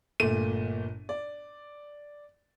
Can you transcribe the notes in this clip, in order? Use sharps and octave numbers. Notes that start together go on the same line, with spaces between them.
G1 A#2 A3 D#7
D5